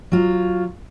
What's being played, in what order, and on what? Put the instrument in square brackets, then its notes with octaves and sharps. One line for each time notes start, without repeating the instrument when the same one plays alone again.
[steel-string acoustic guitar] F#3 F4